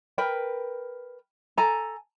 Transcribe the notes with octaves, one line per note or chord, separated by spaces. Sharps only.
A#4 B4 G5
A4 G#5 A#5